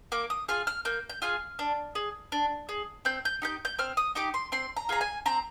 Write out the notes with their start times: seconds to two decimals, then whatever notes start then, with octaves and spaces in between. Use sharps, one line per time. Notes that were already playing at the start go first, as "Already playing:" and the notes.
0.12 A#3 D6
0.30 D#6
0.49 F4 G#4 F6
0.67 F6
0.85 A#3 G6
1.09 G6
1.22 F4 G#4 F6
1.59 D4
1.95 G#4
2.32 D4
2.69 G#4
3.05 C4 G6
3.25 G6
3.42 D#4 G4 G6
3.65 G6
3.79 C4 F6
3.97 D#6
4.15 D#4 G4 D6
4.34 C6
4.52 C4 C6
4.77 A#5
4.89 F4 G#4 A#5
5.01 G#5
5.26 C4 A#5